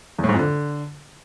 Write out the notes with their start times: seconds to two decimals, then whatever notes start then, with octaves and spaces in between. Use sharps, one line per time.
0.18 E2
0.24 A2
0.29 G#2
0.34 F2
0.39 D3